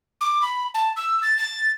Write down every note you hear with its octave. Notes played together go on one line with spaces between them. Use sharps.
D6
B5
A5
E6
A6
A6